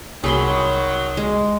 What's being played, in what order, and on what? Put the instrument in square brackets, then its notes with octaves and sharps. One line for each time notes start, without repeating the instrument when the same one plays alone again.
[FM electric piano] C2 D#6 [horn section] D#3 F#3 [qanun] G#4 B5 C6
[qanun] G#3